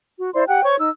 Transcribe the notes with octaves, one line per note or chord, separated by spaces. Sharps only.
F#4
E4 C5 D5 C6
G4 F#5 G5 F#6
C5 C#5 C#6
D#4 E6